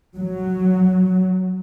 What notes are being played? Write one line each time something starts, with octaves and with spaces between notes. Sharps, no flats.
F#3